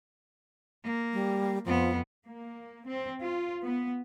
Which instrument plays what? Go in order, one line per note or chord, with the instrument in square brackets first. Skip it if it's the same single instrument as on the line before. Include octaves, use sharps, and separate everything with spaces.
[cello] A#3
[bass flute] G3
[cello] F2 B3 [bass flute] F3
[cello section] A#3
C4
F4
B3